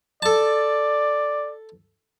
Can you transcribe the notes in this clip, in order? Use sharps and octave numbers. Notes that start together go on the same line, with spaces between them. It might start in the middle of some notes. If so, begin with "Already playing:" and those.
A4 D5 A5